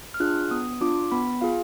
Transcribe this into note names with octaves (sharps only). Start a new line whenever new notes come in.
F6
D4 F4 G#4 F#6
B3 D#6
D4 F4 D6
B3 B5
F4 G#4 F5